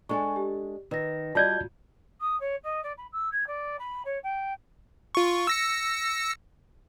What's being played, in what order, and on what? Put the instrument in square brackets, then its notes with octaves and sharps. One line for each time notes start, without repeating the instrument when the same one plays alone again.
[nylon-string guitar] G#3 D4 A4 [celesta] G#5 C#6
[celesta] G4
[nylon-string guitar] D#3 [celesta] B4 A#6
[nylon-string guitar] G3 D5 D#5 [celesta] F4 F#4 [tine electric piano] A5 G6 G#6
[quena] D#6
C#5
D#5
D5
B5
E6
G#6
D5
B5
C#5
G5
[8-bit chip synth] F4 C#6
E6 A#6 C#7